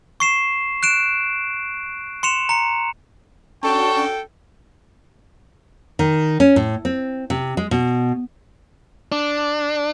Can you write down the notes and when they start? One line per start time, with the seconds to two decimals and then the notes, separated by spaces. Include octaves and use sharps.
0.20 C#6 C7 E7
0.83 F#6 D7 E7
2.23 C6 C#7 E7 F7
2.49 A#5 C#7
3.63 C#4 D4 F#4 A4 G5 A5 C#6
5.99 D#3
6.40 C#4
6.56 A2
6.85 C4
7.30 C3
7.57 G#3
7.71 B2
9.12 D4